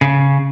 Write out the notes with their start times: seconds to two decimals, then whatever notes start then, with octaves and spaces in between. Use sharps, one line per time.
0.01 C#3